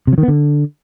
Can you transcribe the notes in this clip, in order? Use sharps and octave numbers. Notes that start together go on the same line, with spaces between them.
C3
F#3
D#3
B3
D3